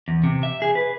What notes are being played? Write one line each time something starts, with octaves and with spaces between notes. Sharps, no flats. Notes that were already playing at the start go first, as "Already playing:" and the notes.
E2
C3
E5
G#4
B4